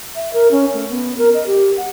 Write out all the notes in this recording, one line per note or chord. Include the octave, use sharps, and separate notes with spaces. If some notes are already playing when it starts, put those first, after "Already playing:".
E5
A#4
C#4
A3
B3
A#4
D#5
G4
F#5